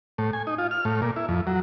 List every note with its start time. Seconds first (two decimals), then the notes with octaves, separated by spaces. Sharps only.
0.18 A2
0.33 G#5
0.47 D#4
0.58 F4
0.71 F6
0.85 A2
1.02 A#2
1.16 E4
1.28 F2
1.47 F#3